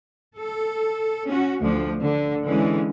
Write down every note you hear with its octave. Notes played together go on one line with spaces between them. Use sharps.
A4
C#4 F#4
D2 F3 D4
D3
D3 E3 G#3 C#4